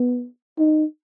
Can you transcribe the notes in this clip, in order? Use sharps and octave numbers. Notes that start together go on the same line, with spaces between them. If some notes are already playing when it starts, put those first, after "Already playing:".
Already playing: B3
D#4